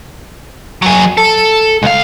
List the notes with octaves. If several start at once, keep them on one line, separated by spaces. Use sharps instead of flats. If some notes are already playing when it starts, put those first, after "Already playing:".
F#3 G#4
A4
C#2 F5